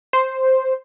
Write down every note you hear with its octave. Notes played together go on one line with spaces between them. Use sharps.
C5